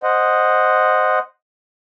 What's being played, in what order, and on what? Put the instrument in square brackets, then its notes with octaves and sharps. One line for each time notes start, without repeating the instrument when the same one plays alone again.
[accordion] C5 D#5 F#5